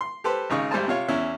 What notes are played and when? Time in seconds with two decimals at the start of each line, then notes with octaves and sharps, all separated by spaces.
0.01 C6
0.24 G4 A4 B4 C5
0.50 G#1 C#3 D#4 C#6
0.71 G#1 G3 A3 C5 G#5 A5
0.88 C3 F4 C#5
1.08 E2 C#4 E4